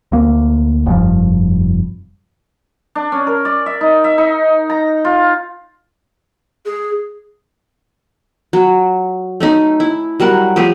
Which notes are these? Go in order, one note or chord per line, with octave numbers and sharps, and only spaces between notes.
D2 A#3
F1 G2 F3
D4
C#4
A#4
D5
E5
D#4
E5
D#4
A#5
F4
G#4
F#3
A3 C#4 D#4
E4
F#3 G3 A#4 F#5
F3 A3 G4 G#4